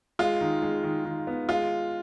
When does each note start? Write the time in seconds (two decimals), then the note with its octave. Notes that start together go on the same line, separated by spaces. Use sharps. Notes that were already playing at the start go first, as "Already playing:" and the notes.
0.19 G#3 F4
0.41 D#3
0.62 G#3
0.84 D#3
1.05 D#3
1.27 B3
1.49 G#3 F4